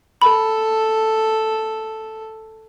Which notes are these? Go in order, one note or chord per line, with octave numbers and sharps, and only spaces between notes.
A4 B5